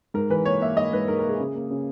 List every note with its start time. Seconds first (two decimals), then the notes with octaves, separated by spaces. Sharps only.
0.14 G#2 A#4
0.30 E3 B4
0.45 A#3 C#5
0.62 A#3 E5
0.77 G#2 D#5
0.92 G#2 B4
1.08 G#2 A#4
1.19 A#4
1.24 A#3
1.29 G#4
1.39 C#3
1.55 A#3
1.70 C#3